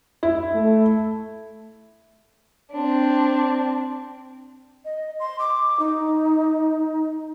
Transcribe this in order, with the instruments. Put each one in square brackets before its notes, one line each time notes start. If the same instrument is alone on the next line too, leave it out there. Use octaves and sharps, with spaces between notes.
[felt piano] E4
[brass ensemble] A3
[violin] C4 D4
[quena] D#5
C6
D6
D#4